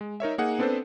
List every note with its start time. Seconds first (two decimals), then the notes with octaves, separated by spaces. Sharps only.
0.01 G#3
0.20 D#4 A#4 C#5 E5
0.38 A#3 D#4 G#4 F#5
0.59 B3 C4 D4 A4 B4 C5